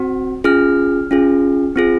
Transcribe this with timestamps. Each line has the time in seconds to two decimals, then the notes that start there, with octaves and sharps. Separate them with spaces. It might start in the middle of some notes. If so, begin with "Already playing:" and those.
Already playing: C4 F#4
0.44 C#4 F4 G#4 F6
1.11 C#4 F4 G#4
1.76 C4 F4 G#4